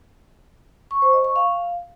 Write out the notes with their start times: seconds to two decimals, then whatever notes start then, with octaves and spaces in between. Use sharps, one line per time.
0.91 C#6
1.02 C5
1.13 D#5
1.24 C#6
1.36 F5